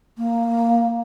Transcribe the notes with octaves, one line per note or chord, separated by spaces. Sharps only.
A#3